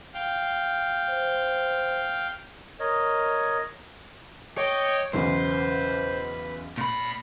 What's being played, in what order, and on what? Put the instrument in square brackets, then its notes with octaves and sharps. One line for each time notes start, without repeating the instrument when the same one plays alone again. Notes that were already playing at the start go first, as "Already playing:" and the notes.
[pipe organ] F5 G5
[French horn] C5
[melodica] A#4 C#5 D#5
[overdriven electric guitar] C#5 [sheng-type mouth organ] D#5 G5 D6
[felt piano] B1 E2 C#3 [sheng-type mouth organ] B4 [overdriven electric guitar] C5
[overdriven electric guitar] A#2 B5